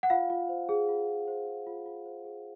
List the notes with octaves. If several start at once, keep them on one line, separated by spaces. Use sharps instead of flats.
F#5
F4 F5
F4
C5
G#4
F4
F4
C5
G#4
F4
F4
C5
G#4